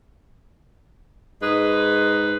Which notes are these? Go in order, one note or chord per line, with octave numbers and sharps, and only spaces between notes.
G#2 D#4 G#4 B4 D#5